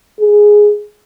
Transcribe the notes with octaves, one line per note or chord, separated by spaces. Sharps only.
G#4